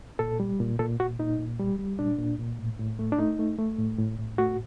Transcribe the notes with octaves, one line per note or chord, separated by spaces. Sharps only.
A#2 A4
G3
A#2
A#2 A4
A#2 F#4
A#2 D#4
A#2
G3
G3
A#2 D4
A#2
A#2
A2
A2
A3
D4
A3 D#4
A3
A3
A2
A2
A2
A3 F#4